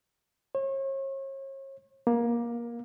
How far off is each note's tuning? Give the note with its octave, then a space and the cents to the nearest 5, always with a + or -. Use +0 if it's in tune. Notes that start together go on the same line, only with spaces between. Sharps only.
C#5 -40
A#3 +20